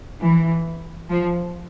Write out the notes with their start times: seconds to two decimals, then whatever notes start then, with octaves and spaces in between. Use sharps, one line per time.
0.20 E3
1.10 F3